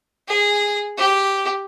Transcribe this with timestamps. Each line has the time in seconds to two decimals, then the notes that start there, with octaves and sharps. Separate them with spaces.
0.28 G#4
0.98 G4